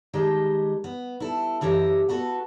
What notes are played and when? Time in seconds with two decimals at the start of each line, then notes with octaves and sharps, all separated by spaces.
0.13 D#3 G#3 G4 D#5 A5
0.84 B3
1.20 E4 A4
1.61 F#2 E3 G4 A4 D#5
2.09 B3 F#4 A4 B4